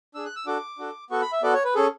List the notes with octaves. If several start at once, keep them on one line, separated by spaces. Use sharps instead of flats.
D4 G#4 E6
F#6
E6
D4 F#4 A4 D6
D4 F#4 A4
B3 F#4 A4 C#6
B5
E5
B3 F#4 A4 D5
C#5
B4
C#4 G#4 A4